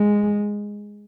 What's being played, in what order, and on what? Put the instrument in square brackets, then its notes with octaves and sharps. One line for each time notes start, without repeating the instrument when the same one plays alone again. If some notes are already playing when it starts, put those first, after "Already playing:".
Already playing: [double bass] G#3